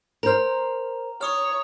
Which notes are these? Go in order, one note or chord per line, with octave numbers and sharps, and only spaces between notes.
A#4 C5 A#5 F6
C#5 C#6 D#6 F6